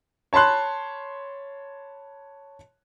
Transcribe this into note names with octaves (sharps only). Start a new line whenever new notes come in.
C#5 A5 B5 C6 F#6